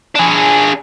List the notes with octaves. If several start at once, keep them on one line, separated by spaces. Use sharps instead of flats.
D4 G#4